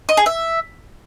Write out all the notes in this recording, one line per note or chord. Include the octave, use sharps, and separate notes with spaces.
D#5
G#4
E5